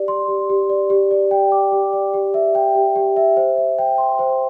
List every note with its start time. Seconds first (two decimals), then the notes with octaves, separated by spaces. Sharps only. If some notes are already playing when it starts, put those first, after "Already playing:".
Already playing: G4 D5
0.08 C6
0.28 G4
0.50 G4
0.70 D5
0.90 G4
1.11 D5
1.31 G5
1.52 D6
1.72 G4
1.93 D5
2.14 G4
2.34 E5
2.55 G5
2.75 G4
2.96 G4
3.16 E5
3.37 C5
3.57 E5
3.79 G5
3.98 C6
4.19 C5